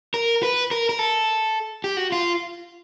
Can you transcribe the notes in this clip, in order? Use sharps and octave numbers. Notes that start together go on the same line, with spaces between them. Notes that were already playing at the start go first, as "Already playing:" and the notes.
A#4
B4
A#4
A#4
A4
G4
F#4
F4